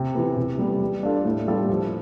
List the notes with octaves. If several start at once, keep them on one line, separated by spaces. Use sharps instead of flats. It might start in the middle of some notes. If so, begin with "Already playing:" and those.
Already playing: C3
E3 B3
C3
G3 B3
G3
D4 F4 A4
A2
G3 B3 F4 A4
F3